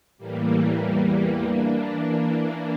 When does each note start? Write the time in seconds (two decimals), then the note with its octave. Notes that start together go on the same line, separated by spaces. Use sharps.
0.18 A2 E3 G3 A#3
0.81 E2 E3
1.43 E3 A#3 D4